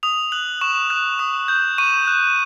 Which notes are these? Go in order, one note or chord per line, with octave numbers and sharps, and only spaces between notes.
D#6 F7
F#6 F#7
C#6 E7
F#6
D#6
G6
C#6 D#7
F#6